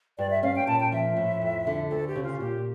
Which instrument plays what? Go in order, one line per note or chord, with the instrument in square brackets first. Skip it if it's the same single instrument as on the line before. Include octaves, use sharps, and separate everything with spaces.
[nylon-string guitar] G2 [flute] D5
[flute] E5
[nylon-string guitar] C#4 [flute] F5
[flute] G5
[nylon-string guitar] A#2 [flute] A5
[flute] G5
[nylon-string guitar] F3 [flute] E5
[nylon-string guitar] A2
F2
D3
[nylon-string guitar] D2 [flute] A4
[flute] G4
[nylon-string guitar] C#3
[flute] F4
[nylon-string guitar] A#2 [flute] G4